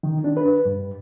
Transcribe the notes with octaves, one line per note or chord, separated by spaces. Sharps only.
D#3
D4
B4
G2